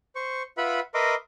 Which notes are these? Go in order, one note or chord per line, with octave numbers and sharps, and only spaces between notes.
C5 C#6
F4 B4 E5 F#5 B5
A#4 B4 D#5 E5 C6 D6